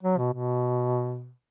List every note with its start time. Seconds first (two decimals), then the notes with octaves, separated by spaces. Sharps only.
0.03 F#3
0.18 B2
0.33 B2